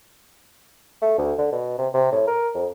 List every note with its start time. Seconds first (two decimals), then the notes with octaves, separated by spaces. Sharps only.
1.02 A3
1.18 D2
1.38 D3
1.52 B2
1.78 C3
1.94 C3
2.12 A2
2.28 A#4
2.54 F2